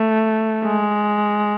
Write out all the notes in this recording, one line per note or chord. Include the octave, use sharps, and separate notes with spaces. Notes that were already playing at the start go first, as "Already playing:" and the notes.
Already playing: A3
G#3